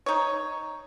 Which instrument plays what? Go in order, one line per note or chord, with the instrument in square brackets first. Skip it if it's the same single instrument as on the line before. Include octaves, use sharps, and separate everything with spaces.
[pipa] D#4 C#5